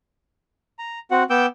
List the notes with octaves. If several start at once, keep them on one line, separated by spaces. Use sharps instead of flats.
A#5
C4 F#4 F#5
B3 G5 D6 E6 G6